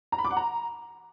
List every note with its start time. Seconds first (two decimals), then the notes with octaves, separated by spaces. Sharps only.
0.12 A#5
0.18 B5
0.24 D6
0.31 F#5
0.37 A#5